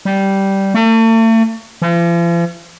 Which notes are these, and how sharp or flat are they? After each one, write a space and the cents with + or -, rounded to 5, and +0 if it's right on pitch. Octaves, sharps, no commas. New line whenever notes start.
G3 -10
A3 +40
F3 -45